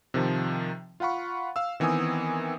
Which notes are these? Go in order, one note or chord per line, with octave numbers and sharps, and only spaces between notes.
C3 D#3 F3
F4 F5 F#5 B5 C#6
F5 E6
D#3 E3 B3 C4 G#5 D#6